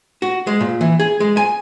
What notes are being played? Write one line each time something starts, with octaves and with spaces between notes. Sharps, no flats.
F#4
G#3
A#2
E3
G#4
G#3
G#5